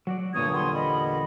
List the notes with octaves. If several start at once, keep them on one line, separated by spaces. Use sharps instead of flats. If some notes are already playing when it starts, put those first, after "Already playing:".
F#3 F#4 D5
E2 G2 A#2 D3 C#5 D#6 G#6
G3 B3 C6
G3 B3 D#5 B5